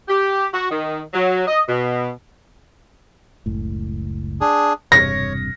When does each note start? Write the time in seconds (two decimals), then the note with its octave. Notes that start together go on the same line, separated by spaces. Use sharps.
0.08 G4
0.53 F#4
0.70 D#3
1.14 F#3
1.47 D#5
1.69 B2
3.46 F#1 C#2 A2
4.41 D4 G#4
4.92 E1 G2 C3 C#5 A#6